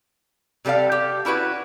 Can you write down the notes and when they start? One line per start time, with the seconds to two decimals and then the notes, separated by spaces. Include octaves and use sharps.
0.65 C3 G3 A4 D5 F5
0.92 G4
1.25 C#4 E4 F#4 B4